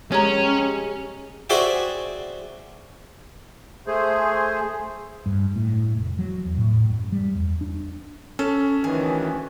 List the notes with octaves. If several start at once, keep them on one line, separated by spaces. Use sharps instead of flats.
G#3 C#4 G4 C#5 A#5
F#4 G#4 C5 D5 E5 G5
A3 G#4 C5
G2
A2
F1
F#3
E2
A2
F#2
G3
E2
D4
C#4 A4
D2 D#3 E3 G#4